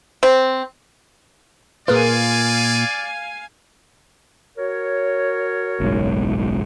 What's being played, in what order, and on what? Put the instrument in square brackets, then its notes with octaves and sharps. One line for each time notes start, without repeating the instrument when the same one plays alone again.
[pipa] C4
[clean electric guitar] A#2 F4 [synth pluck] G#4 A#4 B4 [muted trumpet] D5 [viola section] F5 G#5
[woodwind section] F#4 A#4 C#5
[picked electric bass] F#1 B1 G#2